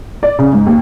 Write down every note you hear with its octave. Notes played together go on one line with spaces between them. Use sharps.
D5
C#3
G#2
D#2